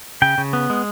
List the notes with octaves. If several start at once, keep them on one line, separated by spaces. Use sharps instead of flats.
C#3 G5
C#3
B3
G#3